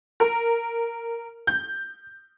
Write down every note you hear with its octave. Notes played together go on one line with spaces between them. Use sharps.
A#4
G6